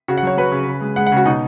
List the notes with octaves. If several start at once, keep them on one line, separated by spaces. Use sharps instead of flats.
C#3 F#4
F#5
F#3 C#5
F#3 B4
C#3
C#3
G#3
G#3 F#5
F#5
C#3 F#4
B2 D#4